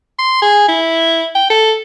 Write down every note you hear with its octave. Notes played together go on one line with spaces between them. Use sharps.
C6
G#4
E4
G5
A4